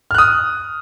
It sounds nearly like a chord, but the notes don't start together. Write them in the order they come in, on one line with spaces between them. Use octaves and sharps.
F6 F#6 D#6